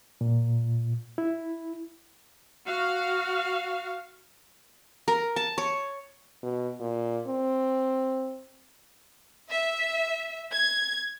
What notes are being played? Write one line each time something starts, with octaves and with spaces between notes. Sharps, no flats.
A#2
E4
F#4 F5
A#4
A5
C#5
B2
A#2
C4
E5
G#6